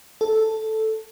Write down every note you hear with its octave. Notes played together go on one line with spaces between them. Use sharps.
A4